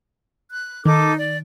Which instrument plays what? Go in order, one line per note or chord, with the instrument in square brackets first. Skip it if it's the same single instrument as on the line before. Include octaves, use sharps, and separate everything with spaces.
[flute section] F#6
[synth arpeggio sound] D#3 [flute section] D#4 A4 D6
[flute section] D5